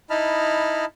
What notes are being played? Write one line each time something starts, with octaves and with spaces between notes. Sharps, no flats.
D#4 E4 D#5 A5 B5 F6